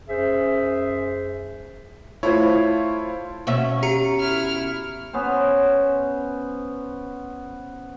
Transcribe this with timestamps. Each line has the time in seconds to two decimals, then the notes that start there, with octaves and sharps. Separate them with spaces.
0.08 F#2 G#4 C5 E5
2.23 A3 E4 F4 C5 C#5
3.47 B2 C#4 E5
3.83 G4 A#5 C#7
4.20 E4 F6
5.13 B3 C#4 C5